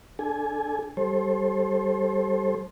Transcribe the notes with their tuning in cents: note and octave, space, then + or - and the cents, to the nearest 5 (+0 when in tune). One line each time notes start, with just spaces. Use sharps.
D4 +0 A4 -25 G#5 +0
G3 -15 A4 -10 C5 +30